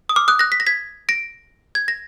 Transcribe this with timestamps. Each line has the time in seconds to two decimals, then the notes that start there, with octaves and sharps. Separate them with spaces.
0.09 D#6
0.16 D6 F6
0.28 D#6 F#6
0.39 F#6 A#6
0.52 B6
0.60 A#6
0.67 G#6 B6
1.09 A#6 D7
1.75 G#6
1.88 A#6